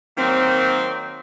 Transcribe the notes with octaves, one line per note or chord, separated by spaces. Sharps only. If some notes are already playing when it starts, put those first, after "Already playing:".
D#3 F#3 A#3 C4